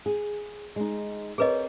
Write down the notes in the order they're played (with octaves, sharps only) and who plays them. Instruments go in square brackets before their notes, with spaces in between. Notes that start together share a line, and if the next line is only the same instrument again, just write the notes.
[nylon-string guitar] G#4
G#3 D#4
[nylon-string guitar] C4 A#4 C#5 [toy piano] G#4 B4 D#5